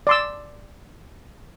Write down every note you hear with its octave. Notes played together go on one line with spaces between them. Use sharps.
D5 C6 E6